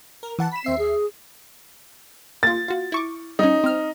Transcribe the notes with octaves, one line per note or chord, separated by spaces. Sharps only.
A#4
E3 F#5 A5
B5 B6 E7
D#2 C4 E5 C7
G#4
A#3 F4 A6
F4 F#4
E4 C#6 D6
G3 C#4 D#4
C4 F6